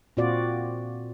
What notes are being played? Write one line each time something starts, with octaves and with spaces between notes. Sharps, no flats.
A#2 C4 F4 F#4 D5